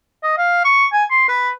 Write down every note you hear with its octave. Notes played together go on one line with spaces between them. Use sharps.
D#5
F5
C#6
G#5
C6
B4